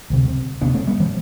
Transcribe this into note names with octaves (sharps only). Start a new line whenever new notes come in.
D2 C3
D2 C3 B3 D4
A3 C4
G3 B3
E3 G3